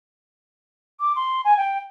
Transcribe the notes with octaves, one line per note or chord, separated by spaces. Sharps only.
D6
C6
G#5
G5